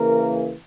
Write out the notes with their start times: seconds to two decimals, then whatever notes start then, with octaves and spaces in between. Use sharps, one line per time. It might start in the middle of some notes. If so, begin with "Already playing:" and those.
Already playing: C#3 E3 A#3 A#4